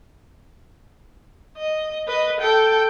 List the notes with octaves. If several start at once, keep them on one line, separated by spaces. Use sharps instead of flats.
D#5
B4 D#5
A4 G5